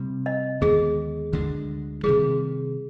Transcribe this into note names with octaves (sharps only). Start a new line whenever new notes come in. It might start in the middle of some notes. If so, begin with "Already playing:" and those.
Already playing: C3 G3 C4
D#5
D#2 D3 G#3 B3 G#4
D2 D3 G#3 D4
C3 D#3 G3 G#4